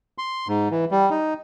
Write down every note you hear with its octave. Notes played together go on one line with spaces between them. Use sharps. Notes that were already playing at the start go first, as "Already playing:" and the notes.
C6
G#2
E3
G3
D#4